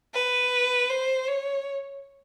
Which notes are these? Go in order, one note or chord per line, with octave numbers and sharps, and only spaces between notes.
B4
C5
C#5